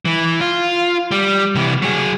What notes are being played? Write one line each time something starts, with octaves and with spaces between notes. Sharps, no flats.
E3
F4
G3
C3 E3
F#3 G#4